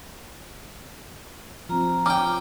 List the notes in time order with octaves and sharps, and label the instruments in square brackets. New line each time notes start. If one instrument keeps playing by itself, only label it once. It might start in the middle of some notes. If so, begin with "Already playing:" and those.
[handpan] F3 C4 [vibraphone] F4 A#5
[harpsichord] C#4 G5 [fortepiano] D6